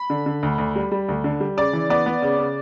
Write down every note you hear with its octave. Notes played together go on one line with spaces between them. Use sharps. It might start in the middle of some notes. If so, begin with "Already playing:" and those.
Already playing: B5
D3
D3
D2
D2
G3
G3
D2
D3
G3
C#3 D5
E3
B3 D5
B3
C#3
C#3